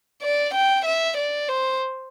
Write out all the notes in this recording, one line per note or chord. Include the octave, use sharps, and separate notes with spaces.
D5
G5
E5
D5
C5